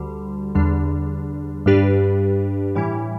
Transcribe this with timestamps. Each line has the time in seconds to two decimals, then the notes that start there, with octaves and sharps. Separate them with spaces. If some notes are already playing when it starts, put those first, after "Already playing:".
Already playing: D2 D3 G3
0.55 E2 D3 G3 D4
1.66 G2 G3 D4 G4 B4
2.75 A2 E3 G3 E4